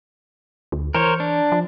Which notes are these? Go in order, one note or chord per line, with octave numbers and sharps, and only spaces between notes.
D2
E3 A#4 C5 C#5
D4
F3